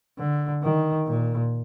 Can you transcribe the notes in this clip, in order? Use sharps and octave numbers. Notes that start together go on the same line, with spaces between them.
D3
D#3
A#2